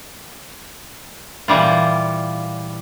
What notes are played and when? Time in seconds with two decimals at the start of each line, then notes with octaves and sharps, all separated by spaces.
1.48 A#2 E3 G3 F4